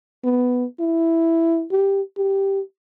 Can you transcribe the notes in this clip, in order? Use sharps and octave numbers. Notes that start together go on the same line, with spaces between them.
B3
E4
G4
G4